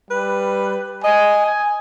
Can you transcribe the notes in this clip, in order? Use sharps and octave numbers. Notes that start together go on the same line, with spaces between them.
G3 B4
D#5 G#5
G#5